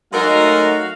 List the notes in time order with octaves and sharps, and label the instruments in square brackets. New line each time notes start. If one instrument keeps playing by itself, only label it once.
[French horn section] F#3 A3 D#4 [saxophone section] G#3 A4 A#4 [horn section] F#4 F5